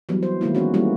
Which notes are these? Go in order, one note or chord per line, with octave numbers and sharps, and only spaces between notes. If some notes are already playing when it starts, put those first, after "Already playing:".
E3 F#3 G3 B3
C5
D#3 G#3 A#3 E4
E3 B3 C#4 F#4
G3 A3 A#3 C#4 E4 F#4